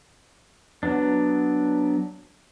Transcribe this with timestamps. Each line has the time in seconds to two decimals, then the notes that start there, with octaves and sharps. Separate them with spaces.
0.83 F#3 B3 D4